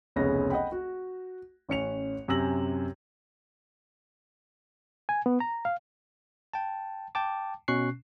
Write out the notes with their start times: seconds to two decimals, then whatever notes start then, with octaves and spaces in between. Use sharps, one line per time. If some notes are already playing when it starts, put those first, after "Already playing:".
0.16 F1 C#2 G#3 B3 C#4 A#6
0.50 D#5 F#5 G5 B5
0.72 F#4
1.69 A1 C#4 C#7 F7
2.28 F#2 C3 G#5 E6 A#6 F#7
5.09 G#5
5.26 B3
5.40 A#5
5.65 F5
6.53 G5 A5
7.15 G5 A5 D6
7.68 B2 C#4 C#6 F#6 C7